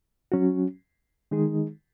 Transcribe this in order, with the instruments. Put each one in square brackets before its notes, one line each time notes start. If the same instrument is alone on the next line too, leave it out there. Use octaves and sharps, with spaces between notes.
[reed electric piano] F#3 C#4 F#4
D#3 G#3 D#4 G#4